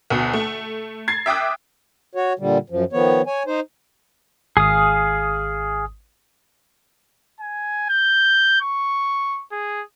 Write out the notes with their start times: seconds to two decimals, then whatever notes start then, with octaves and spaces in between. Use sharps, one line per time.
0.10 D2 B2
0.33 A3
1.08 G#6 A6 C7
1.26 E5 G5 D6 D#6 F#6
2.15 F#4 C#5
2.39 A#2 D3 G3
2.70 F#2 F3
2.93 D#3 F3 B3 C#5
3.27 C#5 G#5
3.47 D#4 C5
4.57 G#1 G#4 F5 D#6
7.40 G#5
7.89 G6
8.61 C#6
9.52 G#4